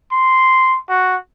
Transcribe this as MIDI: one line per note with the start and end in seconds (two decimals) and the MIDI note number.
0.12 0.78 84
0.89 1.15 66